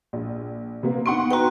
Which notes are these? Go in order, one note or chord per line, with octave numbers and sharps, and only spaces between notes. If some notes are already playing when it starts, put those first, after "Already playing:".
A#1
C3 A#3 B3
B3 D#4 F#5 C6 C#6
F#4 B4 G5 A#5 C6